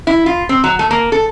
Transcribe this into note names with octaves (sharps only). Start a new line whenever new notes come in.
E4
F4
C4
F#3
A3
A#3
A4